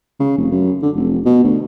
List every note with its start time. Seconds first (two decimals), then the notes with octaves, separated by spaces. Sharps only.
0.20 C#3
0.38 F1
0.51 F#2
0.83 D3
0.96 F1
1.26 B2
1.44 D2